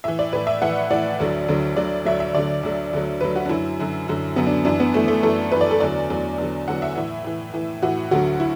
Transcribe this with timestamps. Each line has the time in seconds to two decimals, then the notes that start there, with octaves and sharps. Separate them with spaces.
0.04 A2 E3 E5
0.19 D5
0.33 A2 E3 B4
0.47 E5
0.62 A2 E3 F#5
0.90 A2 E3 D5
1.19 D2 D3 F#3
1.48 D2 D3 F#3
1.76 D2 D3 F#3 D5
2.05 D2 D3 F#3 E5
2.20 E5
2.35 D2 D3 F#3 D5
2.63 D2 D3 F#3
2.93 D2 D3 F#3
3.21 D2 D3 F#3 B4
3.36 F#4
3.46 D4
3.49 F#2 D3 F#3 E4
3.79 F#2 D3 F#3
4.08 F#2 D3 F#3
4.36 F#2 D3 F#3 B3
4.47 D4
4.65 F#2 E3 D4
4.80 B3
4.94 F#2 E3 A3
5.08 A3
5.23 F#2 E3 A4
5.52 F#2 E3 B4
5.61 D5
5.71 A4
5.80 E2 D3 F#3 D5
6.10 E2 D3 F#3
6.38 E2 D3 F#3
6.68 E2 D3 F#3 F#5
6.82 E5
6.95 A2 E3
7.24 A2 E3
7.54 A2 E3
7.83 A2 E3 F#4
8.11 D2 D3 F#3 F#4
8.40 E4